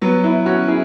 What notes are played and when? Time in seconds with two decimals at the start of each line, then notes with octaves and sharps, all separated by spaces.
0.02 F#3 B3
0.24 B3 E4
0.46 C#4 F#4
0.68 E4 G#4